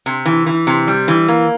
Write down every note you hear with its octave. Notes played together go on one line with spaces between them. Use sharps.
C3
E3
E3
C3
G3
E3
A#3